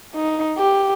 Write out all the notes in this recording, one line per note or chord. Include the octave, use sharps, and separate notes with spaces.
D#4
G4